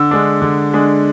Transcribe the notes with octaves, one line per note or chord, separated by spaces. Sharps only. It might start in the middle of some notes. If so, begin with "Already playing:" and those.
Already playing: D3 E6
G#3 D4
D3
G#3 D4